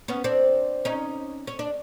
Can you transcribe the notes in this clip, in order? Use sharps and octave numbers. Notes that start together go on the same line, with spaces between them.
B3 C#4
C4 D4
C#4 D#4
C#4
D4